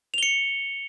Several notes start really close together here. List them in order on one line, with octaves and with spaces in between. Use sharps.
F7 G7 C#7